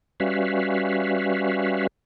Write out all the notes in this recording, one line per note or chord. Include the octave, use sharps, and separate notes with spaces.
G3 C#4 F#4 B4 E5 F5